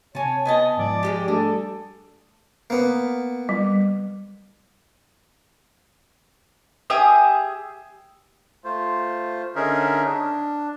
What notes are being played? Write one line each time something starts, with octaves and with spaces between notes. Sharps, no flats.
C3 C#5 G#5 A5
B3 D#5 G#5 A5
G#2 F3 D5
G3 G#3 G4
G3 A3 D4 G#4 A4
A#3 B3
G3
G4 G#4 E5 D#6
A3 F4 C5
D3 C#4 D#4 G#4 A#4 E5
D4